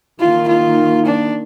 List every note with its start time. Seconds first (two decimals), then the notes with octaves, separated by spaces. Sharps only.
0.20 D#3 A#3 F4
0.48 F4
1.06 D4